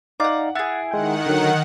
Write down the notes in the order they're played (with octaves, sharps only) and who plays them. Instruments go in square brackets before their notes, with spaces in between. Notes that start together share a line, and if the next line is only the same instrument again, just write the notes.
[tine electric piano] D#4 D5 F5 [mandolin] F#5 D6
[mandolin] E4 G#4 [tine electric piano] F#5 A6
[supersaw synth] D#3 F#5 [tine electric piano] G#3 G5
[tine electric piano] D3 F#3